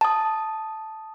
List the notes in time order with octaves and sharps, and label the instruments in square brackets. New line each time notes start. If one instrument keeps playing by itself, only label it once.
[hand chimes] A5 D#6